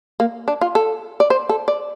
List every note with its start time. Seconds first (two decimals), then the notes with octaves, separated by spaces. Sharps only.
0.20 A#3
0.48 D4
0.61 F4
0.75 A4
1.20 D5
1.30 C5
1.49 A4
1.68 D5